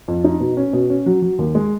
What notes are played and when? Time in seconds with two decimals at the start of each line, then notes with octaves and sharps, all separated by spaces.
0.08 F2
0.24 D#4
0.40 B2
0.57 C#4
0.73 B2
0.90 C#4
1.06 F#3
1.22 F#3
1.39 D#2
1.55 G#3